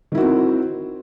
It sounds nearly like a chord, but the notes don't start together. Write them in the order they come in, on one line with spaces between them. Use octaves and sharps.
D#3 E4 F#4 C4